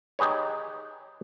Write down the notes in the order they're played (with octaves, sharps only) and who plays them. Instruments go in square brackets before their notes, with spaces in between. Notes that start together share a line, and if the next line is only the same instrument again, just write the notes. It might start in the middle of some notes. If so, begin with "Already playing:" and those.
[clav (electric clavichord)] D#4 G4 G#4 B4 C#5